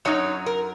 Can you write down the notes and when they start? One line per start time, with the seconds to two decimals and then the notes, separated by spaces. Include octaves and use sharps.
0.05 F#2 F#3 D#4 C#5
0.46 A#4